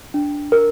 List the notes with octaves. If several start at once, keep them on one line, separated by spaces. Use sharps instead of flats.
D4
A#4